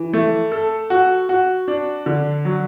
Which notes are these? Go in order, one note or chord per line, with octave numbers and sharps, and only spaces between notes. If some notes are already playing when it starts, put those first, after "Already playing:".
Already playing: E3
A3
A4
F#4
F#4
D4
D3
F#3